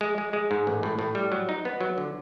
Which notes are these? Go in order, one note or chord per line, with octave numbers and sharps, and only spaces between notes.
G#3
G#3
G#3
G#2
A1
A2
A2
G3
F#3
D#4
B3
F#3
D3